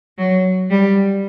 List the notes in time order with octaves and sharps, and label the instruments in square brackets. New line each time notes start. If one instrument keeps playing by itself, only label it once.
[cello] F#3
G3